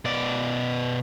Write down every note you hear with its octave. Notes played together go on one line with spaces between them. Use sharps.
B2 D5